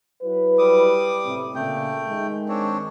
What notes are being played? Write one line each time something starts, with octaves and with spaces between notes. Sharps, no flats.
F#3 E4 B4
G3 D6 D#6
A2 C3
A#2 C#3 A3 G5
D#3 G#3
C4 D4 C#5